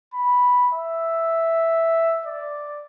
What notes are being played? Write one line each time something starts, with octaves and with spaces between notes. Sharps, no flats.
B5
E5
D5